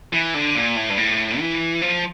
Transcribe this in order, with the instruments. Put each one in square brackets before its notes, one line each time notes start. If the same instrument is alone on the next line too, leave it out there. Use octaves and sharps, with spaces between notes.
[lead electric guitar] E3
D3
A#2
A2
G2
A2
E3
F3